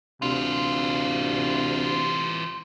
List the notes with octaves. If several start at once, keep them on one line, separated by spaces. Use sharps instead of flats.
D2 C3 E3 F4